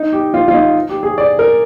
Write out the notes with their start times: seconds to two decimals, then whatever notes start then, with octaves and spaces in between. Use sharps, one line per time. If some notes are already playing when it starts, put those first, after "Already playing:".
Already playing: D#4
0.12 G4
0.34 F4
0.48 F4
0.54 D#4
0.89 G4
1.03 G#4
1.18 D5
1.39 A#4